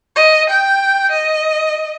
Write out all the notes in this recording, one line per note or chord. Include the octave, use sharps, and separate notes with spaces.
D#5
G5
D#5